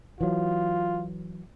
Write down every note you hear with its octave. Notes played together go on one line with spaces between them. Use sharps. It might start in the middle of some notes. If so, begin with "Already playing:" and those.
E3 F#3 F4